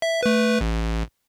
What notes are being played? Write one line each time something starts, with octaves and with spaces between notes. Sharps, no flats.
E5
A3 B4
A1